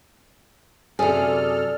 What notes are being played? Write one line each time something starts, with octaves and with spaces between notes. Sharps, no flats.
F#2 C3 G#4 A4 D5 F6